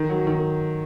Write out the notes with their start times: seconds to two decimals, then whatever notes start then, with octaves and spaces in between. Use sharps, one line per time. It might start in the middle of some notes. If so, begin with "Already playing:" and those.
Already playing: D#3
0.09 F#3
0.27 D#3